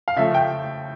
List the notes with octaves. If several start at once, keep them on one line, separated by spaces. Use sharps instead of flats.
F5
C#3 F3 A3 E5
G5